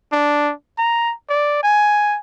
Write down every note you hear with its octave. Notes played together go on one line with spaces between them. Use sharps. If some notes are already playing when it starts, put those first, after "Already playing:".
D4
A#5
D5
G#5